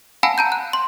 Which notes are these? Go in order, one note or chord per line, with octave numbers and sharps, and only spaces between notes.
F5 F#5 G#5 A5 B5 E6
A5 A#5 G6
F#6
C6